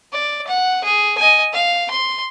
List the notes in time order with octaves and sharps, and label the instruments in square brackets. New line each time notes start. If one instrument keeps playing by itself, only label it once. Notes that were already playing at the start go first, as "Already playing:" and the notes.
[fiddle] D5
F#5
G#4
D#5 G#5
F5
C6